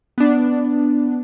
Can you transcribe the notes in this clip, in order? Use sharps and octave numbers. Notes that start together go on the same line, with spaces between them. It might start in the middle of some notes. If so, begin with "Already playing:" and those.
B3 D4